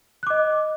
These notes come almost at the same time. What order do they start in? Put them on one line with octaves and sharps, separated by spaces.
F#6 D6 D#5